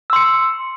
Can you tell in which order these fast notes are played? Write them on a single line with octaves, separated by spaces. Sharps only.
E6 C6 C#7